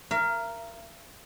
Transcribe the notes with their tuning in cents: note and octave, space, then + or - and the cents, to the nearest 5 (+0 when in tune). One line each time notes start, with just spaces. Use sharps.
A#4 +0 E5 +45